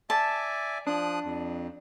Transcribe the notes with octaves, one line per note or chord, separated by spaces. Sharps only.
D5 E5 G#5 A5
F3 D4 D#6 F#6
F2